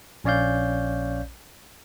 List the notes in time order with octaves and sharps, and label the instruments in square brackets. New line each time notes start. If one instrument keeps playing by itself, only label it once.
[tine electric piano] A#1 C#4 C#5 D5 F5 G6